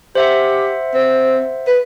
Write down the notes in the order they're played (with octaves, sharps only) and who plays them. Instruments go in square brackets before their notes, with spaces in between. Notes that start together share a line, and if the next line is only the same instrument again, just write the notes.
[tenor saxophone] G4 [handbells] C5 E5 F#5
[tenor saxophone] C4
B4